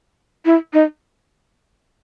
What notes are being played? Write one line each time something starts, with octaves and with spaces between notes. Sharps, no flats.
E4
D#4